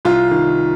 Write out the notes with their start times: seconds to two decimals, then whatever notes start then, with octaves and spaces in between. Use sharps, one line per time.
0.05 C2 F4
0.31 D#3